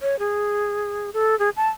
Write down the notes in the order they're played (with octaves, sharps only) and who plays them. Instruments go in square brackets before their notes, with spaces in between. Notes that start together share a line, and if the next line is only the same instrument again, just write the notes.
[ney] C#5
G#4
A4
G#4
A5